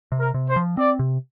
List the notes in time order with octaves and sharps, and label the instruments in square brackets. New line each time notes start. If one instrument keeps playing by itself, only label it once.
[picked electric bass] C3
[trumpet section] A#4
[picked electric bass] C3
[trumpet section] C5
[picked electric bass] F3
[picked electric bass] C4 [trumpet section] D5
[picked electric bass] C3